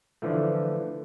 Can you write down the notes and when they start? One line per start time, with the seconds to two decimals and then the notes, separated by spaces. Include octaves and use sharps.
0.22 D3 E3 F3 A3